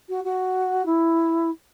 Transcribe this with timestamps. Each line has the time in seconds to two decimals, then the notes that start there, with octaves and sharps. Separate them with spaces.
0.09 F#4
0.24 F#4
0.85 E4